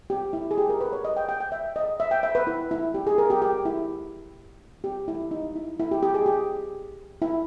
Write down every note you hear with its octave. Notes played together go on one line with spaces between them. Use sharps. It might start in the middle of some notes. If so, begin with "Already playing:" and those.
G4
E4
G#4
G4
A#4
B4
C#5
D#5
G5
G5
G5
E5
D#5
E5
G5
E5
B4
E4
E4
G4
G#4
A#4
G4
G4
E4
G4
E4
D#4
E4
E4
G4
G4
G#4
G4
E4